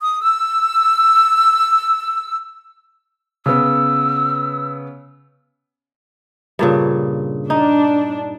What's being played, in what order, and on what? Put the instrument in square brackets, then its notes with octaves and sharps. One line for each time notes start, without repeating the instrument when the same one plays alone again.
[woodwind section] D#6
E6
[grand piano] C#3 B3 [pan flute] E6
[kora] G2 A#2 C#3
[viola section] D4 [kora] D#4